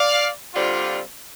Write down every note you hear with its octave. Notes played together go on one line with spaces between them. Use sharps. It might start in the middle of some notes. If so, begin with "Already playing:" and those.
Already playing: D5 F5
D3 G3 C4 F4